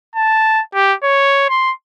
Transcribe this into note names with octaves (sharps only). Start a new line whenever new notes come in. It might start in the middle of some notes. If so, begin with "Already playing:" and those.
A5
G4
C#5
C6